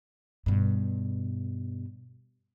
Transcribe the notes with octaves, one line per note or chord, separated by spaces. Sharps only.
G2 B2